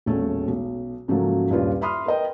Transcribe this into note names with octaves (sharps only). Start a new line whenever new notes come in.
E1 A#1 A3 C#4
B1
G#2 C#3 F3 F#3 A3 A#3
D#1 G2 C#4 F4 B4
E5 B5 C6 D#6 F6
A#4 B4 D#5 G5